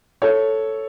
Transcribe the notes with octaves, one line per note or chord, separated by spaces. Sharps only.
A4 C#5